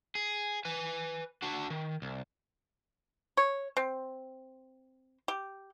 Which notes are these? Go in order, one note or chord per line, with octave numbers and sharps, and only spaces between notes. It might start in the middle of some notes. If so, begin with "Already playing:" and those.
G#4
B4 G#5
D4 F#4
D#3
C2
C#5
C4
G4